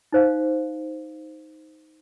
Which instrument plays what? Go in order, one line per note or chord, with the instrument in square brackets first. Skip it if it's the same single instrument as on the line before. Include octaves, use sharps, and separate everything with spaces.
[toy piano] D#4 C5 F5